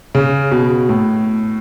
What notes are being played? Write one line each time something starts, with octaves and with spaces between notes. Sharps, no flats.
C#3
B2
A2